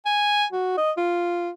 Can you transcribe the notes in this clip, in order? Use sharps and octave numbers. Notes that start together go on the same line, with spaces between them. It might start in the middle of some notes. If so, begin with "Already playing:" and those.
G#5
F#4
D#5
F4